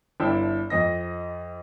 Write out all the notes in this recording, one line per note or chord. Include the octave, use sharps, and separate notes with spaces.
G1 D4 E4 G5 A5 E6
F2 D#5 A#6